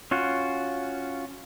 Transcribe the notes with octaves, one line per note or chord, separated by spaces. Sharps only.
C#4 F4 F#4